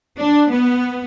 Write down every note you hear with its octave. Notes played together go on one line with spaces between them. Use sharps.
D4
B3